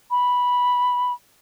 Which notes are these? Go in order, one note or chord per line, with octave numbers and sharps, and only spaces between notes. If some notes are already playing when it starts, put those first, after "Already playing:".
B5